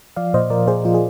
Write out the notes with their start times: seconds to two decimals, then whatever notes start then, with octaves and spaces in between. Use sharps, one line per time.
0.16 F3 D5 F5
0.34 A#2 C5 D#5
0.50 F3 A#4 D5
0.67 A#2 G#4 C5
0.85 F3 F4
0.94 G#4